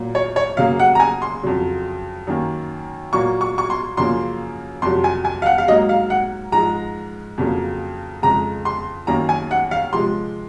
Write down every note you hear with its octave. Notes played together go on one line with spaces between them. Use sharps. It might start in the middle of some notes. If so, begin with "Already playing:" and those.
Already playing: A#2 F#3 A#3
C#5
C#5
F#2 C#3 F#3 A#3 F5
F#5
A#5
G#5
C6
F2 C#3 F#3
F#2 D#3 A#3
A#2 F#3 A#3 C#6
C#6
C#6
C6
F#2 C#3 F3 A#3 C6
F2 C3 F#3 C6
G#5
G#5
F5
F#5
F5
G#2 F#3 A#3 D#5
F5
F#5
G#2 F3 G#3 A#5
F2 C#3 F#3 A#3
F2 C#3 G#3 A#5
C6
F#2 D#3 A#3 A#5
G#5
F#5
F5
C3 F3 G#3 C6